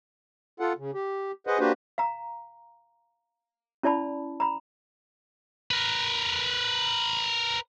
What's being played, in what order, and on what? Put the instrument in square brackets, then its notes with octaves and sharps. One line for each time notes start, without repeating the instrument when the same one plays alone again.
[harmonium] F4 A4 F#5
C#3
G4
G#4 B4 C5 D#5 F#5
A#3 D4 F#4 G4 B4 C5
[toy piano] F5 A#5
C#4 E4 D5 A5 B5
A#5 B5
[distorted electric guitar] A#4 B4